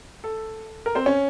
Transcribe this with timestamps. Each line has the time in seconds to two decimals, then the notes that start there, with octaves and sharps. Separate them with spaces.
0.24 A4
0.86 A#4
0.95 C4 C5
1.06 C#4 C#5